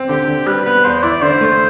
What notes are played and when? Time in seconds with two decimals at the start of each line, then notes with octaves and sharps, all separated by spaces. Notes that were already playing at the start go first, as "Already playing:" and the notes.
Already playing: C4
0.09 D3 G4
0.28 D3
0.47 G3 B4
0.66 B3 B4
0.84 E2 C5
1.03 E4 D5
1.22 D3 C5
1.41 A3